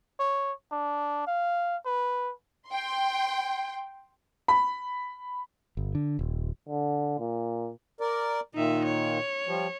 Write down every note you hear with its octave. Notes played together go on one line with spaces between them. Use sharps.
C#5
D4
F5
B4
G5 C6
B5
G1
D3
D#1
D3
A#2
A#4 D5
A#2 D#3 D#4 E5
C#5
F3 G3